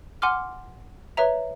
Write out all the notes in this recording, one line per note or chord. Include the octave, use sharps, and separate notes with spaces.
F#5 G#5 C6 D6 F6
B4 C#5 E5 A#5